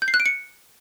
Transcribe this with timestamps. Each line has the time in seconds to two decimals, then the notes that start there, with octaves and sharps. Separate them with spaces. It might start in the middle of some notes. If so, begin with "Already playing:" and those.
0.02 G6
0.08 C7
0.14 F#6
0.20 D7
0.26 C#7